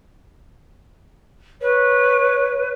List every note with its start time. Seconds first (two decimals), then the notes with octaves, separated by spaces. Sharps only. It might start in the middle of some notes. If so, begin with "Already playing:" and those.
1.61 B4 C#5